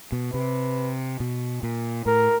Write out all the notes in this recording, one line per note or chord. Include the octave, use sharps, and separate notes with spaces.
B2
C3 B4
B2
A#2
A2 A#4